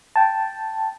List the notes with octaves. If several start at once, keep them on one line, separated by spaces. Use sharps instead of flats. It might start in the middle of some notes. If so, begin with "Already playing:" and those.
G5 A5